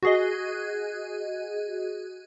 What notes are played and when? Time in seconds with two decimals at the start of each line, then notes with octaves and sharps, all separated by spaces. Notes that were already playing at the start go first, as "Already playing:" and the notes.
0.03 F#4 G#4 D#5